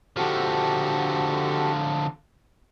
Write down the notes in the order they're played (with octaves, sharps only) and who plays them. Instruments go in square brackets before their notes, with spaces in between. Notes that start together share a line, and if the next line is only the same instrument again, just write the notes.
[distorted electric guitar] D3 F3 [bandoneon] F#4 G4 A4